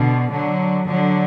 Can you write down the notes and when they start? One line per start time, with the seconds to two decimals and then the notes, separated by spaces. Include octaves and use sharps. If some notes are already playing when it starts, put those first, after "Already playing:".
Already playing: B2 D3
0.31 D3 F#3
0.86 D3 F#3